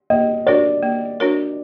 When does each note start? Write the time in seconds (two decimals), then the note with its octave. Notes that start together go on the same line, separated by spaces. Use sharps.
0.10 A#3 D#5
0.46 D4 F#4 A#4 C#5 D5
0.83 A#3
1.20 D4 F#4 A#4 C#5